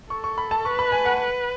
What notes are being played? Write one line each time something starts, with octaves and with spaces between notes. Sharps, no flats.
A4 C#6
C#6
B5
A5
B4 C#6
B5
G#5
F#5
B4